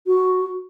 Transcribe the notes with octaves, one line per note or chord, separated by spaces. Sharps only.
F#4